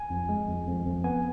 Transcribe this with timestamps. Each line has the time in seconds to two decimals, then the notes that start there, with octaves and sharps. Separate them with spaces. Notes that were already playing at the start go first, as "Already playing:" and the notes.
Already playing: G#5
0.10 F2
0.29 G#3
0.48 F2
0.67 F2
0.85 F2
1.04 B3 G#5